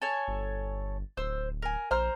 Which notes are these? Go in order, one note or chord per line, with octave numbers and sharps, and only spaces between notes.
A4 C#5 G#5
G1
D1 C5 E6
A#4 G#5
A#1 C5 A#5 F6